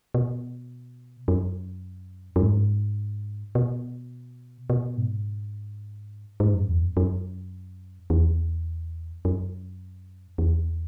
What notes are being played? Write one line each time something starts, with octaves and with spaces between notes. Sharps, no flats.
B2
F#2
F#2
G#2
B2
B2
G#2
G#2
F#2
E2
F#2
F#2
E2
F#2
E2